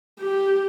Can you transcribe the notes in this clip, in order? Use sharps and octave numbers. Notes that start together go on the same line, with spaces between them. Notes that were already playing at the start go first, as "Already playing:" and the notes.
G4